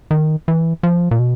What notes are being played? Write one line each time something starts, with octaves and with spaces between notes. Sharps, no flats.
D#3
E3
F3
A#2
B2